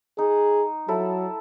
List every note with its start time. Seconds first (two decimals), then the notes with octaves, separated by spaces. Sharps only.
0.18 D#4 G#4
0.88 F#3 E4 A4 B5